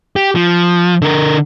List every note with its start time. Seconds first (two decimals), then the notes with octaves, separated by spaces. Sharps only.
0.16 G4
0.35 F3
1.02 D3 A#4